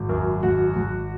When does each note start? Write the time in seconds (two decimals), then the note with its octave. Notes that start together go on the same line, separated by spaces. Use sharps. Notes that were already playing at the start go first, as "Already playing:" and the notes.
Already playing: G#1
0.09 F#2 A#4
0.43 G#1 F#4
0.76 G#1